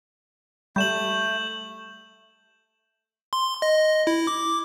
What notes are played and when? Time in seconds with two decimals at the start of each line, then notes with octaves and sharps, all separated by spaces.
0.76 G3 A3 G6 E7 F#7
3.33 C6
3.62 D#5
4.07 E4
4.27 D6